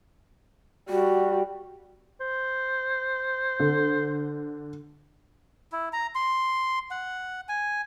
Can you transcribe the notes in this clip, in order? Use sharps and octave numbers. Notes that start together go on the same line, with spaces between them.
G3 F#4
C5
D3
E4
A#5
C6
F#5
G#5